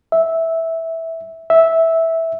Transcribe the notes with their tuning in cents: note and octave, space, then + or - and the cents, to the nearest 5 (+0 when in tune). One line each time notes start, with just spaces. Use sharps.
E5 -10
E5 -10